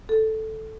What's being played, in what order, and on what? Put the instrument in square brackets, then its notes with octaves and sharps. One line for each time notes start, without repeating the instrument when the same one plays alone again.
[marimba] A4